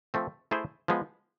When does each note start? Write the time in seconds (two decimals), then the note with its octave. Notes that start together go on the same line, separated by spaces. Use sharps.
0.14 F3 A3 C4
0.51 A3 E4 G#4 C5
0.88 F3 G#3 B3